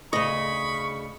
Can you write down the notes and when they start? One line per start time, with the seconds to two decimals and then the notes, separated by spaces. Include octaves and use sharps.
0.13 D2 C#3 D#5 B5 C#6